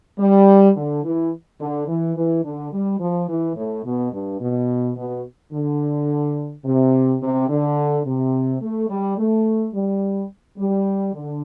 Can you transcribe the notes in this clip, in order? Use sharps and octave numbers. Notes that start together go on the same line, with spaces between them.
G3
D3
E3
D3
E3
E3
D3
G3
F3
E3
A2
B2
G2
B2
B2
D3
C3
C3
D3
C3
A3
G3
A3
G3
G3
D3